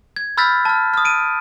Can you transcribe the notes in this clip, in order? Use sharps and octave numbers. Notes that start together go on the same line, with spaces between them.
G#6
B5 E6 F6 G6 A6 B6
A5 F6
D#6 F6
D7 D#7